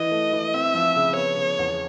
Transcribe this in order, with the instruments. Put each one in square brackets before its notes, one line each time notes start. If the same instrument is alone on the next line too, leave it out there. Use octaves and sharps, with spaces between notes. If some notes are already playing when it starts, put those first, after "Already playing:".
Already playing: [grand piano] E3 [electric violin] D#5
[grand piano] A3
E3
[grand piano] C4 [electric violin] E5
[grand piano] F3
C#3
[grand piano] B3 [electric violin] C#5
[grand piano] C#3
E2